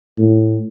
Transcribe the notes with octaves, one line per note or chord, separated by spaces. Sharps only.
A2